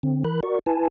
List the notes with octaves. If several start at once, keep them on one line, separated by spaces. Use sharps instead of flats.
D3 C4
E3 A#4 B5 F#6
F#4 A#4 D5 C#6
E4 B4 G#5 A5